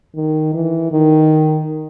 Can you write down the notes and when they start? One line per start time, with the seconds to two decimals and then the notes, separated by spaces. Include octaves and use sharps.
0.16 D#3
0.54 E3
0.92 D#3